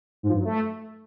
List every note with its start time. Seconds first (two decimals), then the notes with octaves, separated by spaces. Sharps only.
0.23 G#2
0.28 F3
0.34 G2
0.39 F#3
0.45 A3